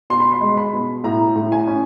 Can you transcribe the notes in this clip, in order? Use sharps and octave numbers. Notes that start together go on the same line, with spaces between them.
B2 C6
B5
C6
G#3
B5
B2
A2 A#5
A2
G#5
C#4